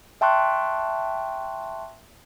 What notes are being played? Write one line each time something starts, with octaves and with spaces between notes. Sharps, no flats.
E5 G5 A5 C6 C#6 F#6